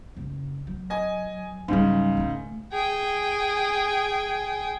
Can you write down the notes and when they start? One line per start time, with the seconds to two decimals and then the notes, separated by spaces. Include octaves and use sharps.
0.17 F#1
0.67 F#3
0.90 D#5 G#5
1.68 G#2 C#3 F#3 G3
2.17 D#3 A3
2.73 G#4 G5